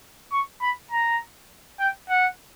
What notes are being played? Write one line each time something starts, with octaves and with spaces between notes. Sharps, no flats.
C#6
B5
A#5
G5
F#5